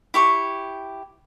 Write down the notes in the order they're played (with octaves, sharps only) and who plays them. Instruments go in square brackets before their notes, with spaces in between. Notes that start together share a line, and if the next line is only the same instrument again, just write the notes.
[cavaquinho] E4 G4 C#6